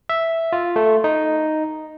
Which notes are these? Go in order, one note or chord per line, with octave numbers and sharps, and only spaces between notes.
E5
F4
A3
D#4